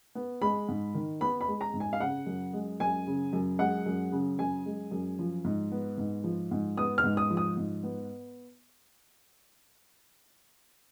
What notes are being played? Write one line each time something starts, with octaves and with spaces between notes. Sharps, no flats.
B3
G#3 B5
G#2
D#3
B3 B5
B5
G#3
A#5
G#2
G#5
F5
C#3 F#5
F#2
G#3
F#2 G#5
C#3
F#2
G#3 F#5
F#2
C#3
F#2 G#5
G#3
F#2
F3
G#2
B3
G#2
F3
G#2
B3 D#6
F6
G#2
D#6
F3
D#6
G#2
B3